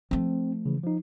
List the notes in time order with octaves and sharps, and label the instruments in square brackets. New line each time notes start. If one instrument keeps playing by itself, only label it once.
[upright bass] F3 A3 [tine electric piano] C4
[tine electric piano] C#3 E3
F3 D#4